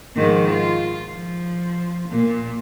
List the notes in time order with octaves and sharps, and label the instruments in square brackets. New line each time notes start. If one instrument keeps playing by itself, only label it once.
[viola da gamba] G#2 D#3 F3
F4
F3
A#2